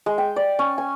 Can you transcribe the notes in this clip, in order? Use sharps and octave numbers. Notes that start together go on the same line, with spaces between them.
G#3
G5
D5
C#4
G#5